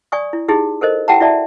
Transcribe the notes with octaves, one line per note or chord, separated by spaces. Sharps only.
D5 G#5 C#6 D#6
E4
D#4 E4 G4 G#4
A4 A#4 C5 D#5
E4 G4 F#5 G5 A5 A#5
E4 F#4 D5 E5 A5